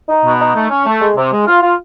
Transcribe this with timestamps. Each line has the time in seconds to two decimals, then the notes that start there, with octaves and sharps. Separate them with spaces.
0.09 D#4
0.25 B2
0.41 D#4
0.55 A3
0.70 C#4
0.86 A3
1.02 G#3
1.17 C3
1.32 G#3
1.47 F4
1.63 F4